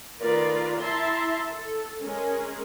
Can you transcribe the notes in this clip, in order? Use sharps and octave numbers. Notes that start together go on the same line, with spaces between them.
D#3 A3 F4 A#4 B4 D5
E4 E5 A5 A#5 C6
A4
G#3 C#4 G#4 A#4